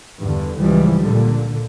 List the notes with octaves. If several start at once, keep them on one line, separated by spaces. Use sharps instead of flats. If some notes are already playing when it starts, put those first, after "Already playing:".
E2 G2 D3
C#2 G#2 E3 F3 G3
A#2 D3